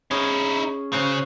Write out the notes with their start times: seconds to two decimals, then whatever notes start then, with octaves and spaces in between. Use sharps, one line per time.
0.11 C#4 D#4 E4 G#4 C#5
0.92 C#3 C#4 F#4 C5